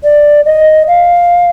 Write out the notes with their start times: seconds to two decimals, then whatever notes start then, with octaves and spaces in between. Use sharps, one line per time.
0.04 D5
0.46 D#5
0.87 F5